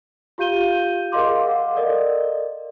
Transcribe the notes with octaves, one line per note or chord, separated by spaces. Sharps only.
F4 G4 F5 G6 D#7 G7
G#4 A#4 D#5 F5 C6 D6
F5 F#5
A4 A#4 D5 D#5